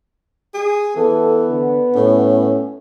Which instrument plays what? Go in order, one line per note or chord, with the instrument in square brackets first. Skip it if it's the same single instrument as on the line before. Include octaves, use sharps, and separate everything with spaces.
[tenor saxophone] G#4
[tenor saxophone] E3 [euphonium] B3 [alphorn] A4
[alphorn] D3
[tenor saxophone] A2 [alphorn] C#4